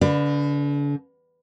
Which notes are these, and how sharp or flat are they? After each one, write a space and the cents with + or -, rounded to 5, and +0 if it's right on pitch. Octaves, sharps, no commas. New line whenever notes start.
D3 -40 B4 +0 D5 +20